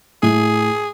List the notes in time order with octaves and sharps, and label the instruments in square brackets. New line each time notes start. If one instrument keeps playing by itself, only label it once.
[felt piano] A2 [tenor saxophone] G#4